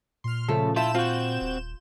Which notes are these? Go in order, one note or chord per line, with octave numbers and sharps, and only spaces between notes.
A#2 C6 F6
C#3 F3 A3 A4
E4 F4 A4 E5 G6 E7
C4 F4 F#4
D#1